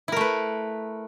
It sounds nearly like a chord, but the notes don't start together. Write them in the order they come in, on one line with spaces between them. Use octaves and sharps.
E4 A#4 A3 B4